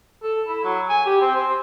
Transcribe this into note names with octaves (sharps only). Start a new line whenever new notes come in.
A4
E4
F#3
G#5
G4
C4
C5